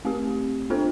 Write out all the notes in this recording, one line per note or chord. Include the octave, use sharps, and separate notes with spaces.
A3 C4 G4
B3 D4 F4 A4 C5